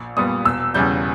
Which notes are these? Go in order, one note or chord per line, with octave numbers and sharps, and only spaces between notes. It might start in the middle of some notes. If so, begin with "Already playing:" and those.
Already playing: A#1
A#2 G3 B3 D#6
E1 E6
E2 C#3 G3 G6